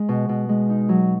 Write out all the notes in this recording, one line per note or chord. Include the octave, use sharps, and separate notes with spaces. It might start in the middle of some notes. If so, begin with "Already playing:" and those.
Already playing: G#3
B2
B2
G#3
D#4
F#3